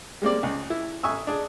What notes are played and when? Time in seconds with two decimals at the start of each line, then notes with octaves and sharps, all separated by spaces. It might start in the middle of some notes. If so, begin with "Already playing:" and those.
0.22 G3 G#3 A#3 C4 D5
0.43 C#2
0.70 E4
1.03 A1 E5 G#5 C#6 D#6 E6
1.27 D4 G#4